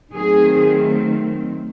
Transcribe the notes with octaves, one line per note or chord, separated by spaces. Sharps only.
D#3 F#3 A3 C4 G#4